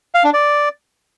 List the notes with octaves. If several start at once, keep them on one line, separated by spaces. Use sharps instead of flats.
F5
D4
D5